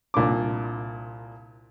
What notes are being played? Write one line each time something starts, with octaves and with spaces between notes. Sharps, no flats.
C2 A#2 D4 D6